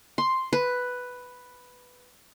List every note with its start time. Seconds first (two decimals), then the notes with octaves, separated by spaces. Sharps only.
0.18 C6
0.53 B4